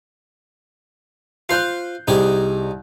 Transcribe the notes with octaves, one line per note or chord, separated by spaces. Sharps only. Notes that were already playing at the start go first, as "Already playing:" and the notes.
F4 C5 F5 F#6 G6 C7
C2 D#4 G4 G#4